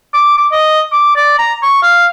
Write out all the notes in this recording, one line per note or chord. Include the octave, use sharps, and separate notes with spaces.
D6
D6
D#5
D6
D5
A#5
C#6
F5